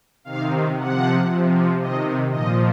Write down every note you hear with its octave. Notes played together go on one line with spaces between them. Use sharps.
C3 D#3 F5
C3 F3 F#5
C3 F3
C3 D#3 D#5
A#2 F3 D#5